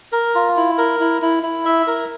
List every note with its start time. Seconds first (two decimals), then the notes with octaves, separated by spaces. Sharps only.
0.12 A#4
0.35 F4
0.57 E4
0.78 A#4
1.00 E4
1.22 E4
1.43 E4
1.65 E5
1.87 A#4